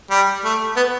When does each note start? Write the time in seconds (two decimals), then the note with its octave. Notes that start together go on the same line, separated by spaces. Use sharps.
0.11 G3
0.44 A3
0.76 B3